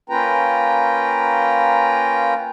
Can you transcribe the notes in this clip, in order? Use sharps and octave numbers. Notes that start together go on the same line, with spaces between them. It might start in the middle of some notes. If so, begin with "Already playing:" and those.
A#3 C#4 F4 B4 G5 A#5